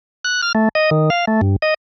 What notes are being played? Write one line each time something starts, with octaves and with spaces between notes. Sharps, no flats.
F#6
F6
A3
D#5
D#3
F5
A3
G2
D#5